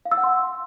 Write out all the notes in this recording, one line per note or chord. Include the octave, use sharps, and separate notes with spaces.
F5
E6
F#5
C6